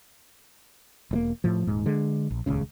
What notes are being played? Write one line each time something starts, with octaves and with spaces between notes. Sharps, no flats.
E1 G#2 A#3
A2 F3
D#1 G#2
D3 G#3
A#1
D#1 C#2 C#3